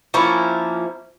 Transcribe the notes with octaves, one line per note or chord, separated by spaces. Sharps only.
F3 A#3 C#4 E4